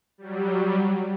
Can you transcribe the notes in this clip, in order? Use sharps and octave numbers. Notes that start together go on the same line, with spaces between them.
F#3 G3